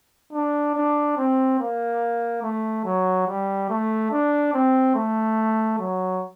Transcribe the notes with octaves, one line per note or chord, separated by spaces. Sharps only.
D4
D4
C4
A#3
A3
F#3
G3
A3
D4
C4
A3
F#3